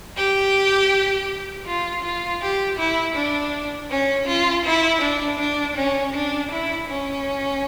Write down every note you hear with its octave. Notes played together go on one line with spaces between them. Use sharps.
G4
F4
F4
G4
E4
D4
C#4
F4
E4
D4
D4
C#4
D4
E4
C#4